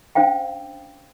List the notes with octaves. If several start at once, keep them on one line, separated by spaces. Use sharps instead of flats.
C#4 D4 C5 F5 G5